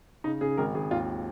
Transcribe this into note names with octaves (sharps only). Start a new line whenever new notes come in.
C#3 D#4
C#3 G#4
G#1 A#4
G#1 G#4
D#2 F4